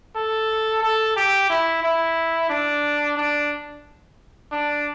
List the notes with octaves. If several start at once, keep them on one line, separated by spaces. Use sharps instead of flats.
A4
A4
G4
E4
E4
D4
D4
D4